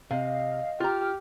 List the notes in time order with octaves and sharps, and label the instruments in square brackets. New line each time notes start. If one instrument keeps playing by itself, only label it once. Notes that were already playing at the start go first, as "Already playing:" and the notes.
[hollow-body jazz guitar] C3 [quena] D#5 [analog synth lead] F5
[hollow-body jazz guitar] F4 A#5 [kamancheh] G4 [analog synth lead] F6